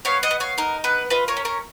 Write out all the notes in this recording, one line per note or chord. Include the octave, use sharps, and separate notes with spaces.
B3 C#5 F5
D#5 F#5
B3
C#5 F5
D#4 A#4
B3 B4
F4 B4 D#5
A#4 C#5
C#4
A#4 C#5